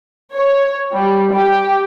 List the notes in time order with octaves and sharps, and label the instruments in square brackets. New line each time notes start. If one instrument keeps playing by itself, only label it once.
[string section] C#5
G3
G4